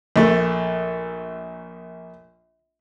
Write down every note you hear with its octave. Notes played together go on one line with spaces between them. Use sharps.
A#1 A3